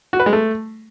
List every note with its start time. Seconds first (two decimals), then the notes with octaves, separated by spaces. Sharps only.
0.13 F#4
0.20 B4
0.26 G#3
0.33 A3